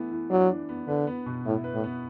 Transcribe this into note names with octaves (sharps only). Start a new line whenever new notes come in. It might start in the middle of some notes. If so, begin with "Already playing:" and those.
Already playing: E3 A3 B3
E3
F#3 D4
E3
B3
D3 B4
B3
B2
A2 E4
B4
A2
B3